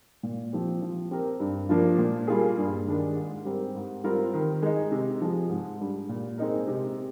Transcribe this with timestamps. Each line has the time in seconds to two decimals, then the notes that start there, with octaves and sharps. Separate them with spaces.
0.23 A#2
0.53 F3 C4 G4
0.82 F3
1.11 C4 G4 A#4
1.40 G2
1.69 F3 A#3 D4 F4
1.98 A#2
2.27 G3 A#3 F4 G#4
2.57 G2
2.87 D#3 G#3 D4
3.16 G#2
3.45 G3 C4 G4 A#4
3.75 G#2
4.04 G3 C4 F4 A#4
4.34 D#3
4.62 G#3 D#4
4.92 C3
5.22 F3 G#3
5.50 G#2
5.80 G3 D4
6.09 A#2
6.38 G#3 C4 D#4 A#4
6.68 C3